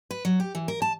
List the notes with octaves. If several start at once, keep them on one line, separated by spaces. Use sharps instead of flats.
B4
F#3
G4
E3
A#4
A5